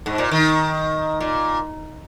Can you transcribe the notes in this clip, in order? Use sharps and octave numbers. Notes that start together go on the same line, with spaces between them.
G#2
A#2
D#3
A#2